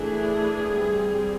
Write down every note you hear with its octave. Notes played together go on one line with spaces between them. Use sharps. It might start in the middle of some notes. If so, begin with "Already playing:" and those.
Already playing: E3 A3 D4 G#4
G3 C4